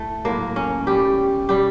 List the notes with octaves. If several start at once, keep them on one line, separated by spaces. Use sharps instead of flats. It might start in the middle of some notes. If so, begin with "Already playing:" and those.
Already playing: A2 A3
A2 F#3 A#3
C#4
B2 G3 G4
B2 G3 G4